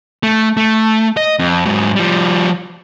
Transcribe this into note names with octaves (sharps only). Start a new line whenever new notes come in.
A3
A3
D#5
F2
G#2 F#3
F3 G3